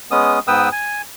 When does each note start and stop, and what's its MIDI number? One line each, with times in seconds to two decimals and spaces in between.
0.11 0.39 56
0.11 0.39 59
0.11 0.39 61
0.11 0.39 87
0.47 0.69 44
0.47 0.69 59
0.47 0.69 71
0.47 0.69 79
0.47 0.69 87
0.47 0.69 88
0.72 1.02 80